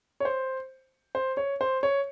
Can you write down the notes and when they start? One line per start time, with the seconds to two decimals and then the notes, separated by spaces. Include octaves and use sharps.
0.20 C#5
0.25 C5
1.15 C5
1.37 C#5
1.61 C5
1.83 C#5